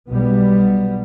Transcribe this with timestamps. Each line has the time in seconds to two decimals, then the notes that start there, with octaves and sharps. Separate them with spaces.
0.10 B1 G3 B3